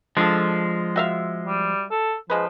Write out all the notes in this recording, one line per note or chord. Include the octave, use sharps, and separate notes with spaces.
F3 G#3 D4 F4 A4
F#4 E5 F5
G3
A4
C#3 F3 G#3 B4